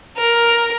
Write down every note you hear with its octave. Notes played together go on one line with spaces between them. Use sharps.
A#4